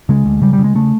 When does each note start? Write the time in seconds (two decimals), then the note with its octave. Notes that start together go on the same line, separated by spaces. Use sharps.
0.09 C#3 G#3
0.26 D2
0.41 C#3 G3
0.53 G3
0.59 C#3
0.64 G#3
0.75 C#3 A3